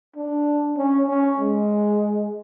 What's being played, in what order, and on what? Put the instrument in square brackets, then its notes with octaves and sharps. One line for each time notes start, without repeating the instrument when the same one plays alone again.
[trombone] D4
C#4
C#4
G#3